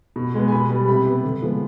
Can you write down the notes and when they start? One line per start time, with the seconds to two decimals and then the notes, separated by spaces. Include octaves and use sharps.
0.16 B2
0.34 G#3 B3
0.48 G#5
0.52 B2 B5
0.70 G3 B3
0.88 C3 B5
1.06 G3 B3
1.24 D3
1.42 F3 G#3 B3